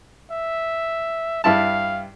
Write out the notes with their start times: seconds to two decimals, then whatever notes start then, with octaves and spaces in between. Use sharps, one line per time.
0.31 E5
1.44 G2 E4 F5 A5